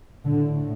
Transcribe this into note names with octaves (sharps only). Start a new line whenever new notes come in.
A2 D3